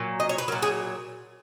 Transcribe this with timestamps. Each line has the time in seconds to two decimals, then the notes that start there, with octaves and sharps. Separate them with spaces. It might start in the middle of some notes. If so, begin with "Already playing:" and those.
Already playing: A#2 F#3
0.20 D#5
0.29 C#5
0.38 B4
0.48 F#3 A#4
0.52 A#2
0.62 G#4